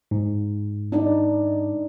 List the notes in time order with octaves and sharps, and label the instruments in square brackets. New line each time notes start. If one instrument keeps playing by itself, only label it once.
[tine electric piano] G#2
[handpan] D4 D#4 D5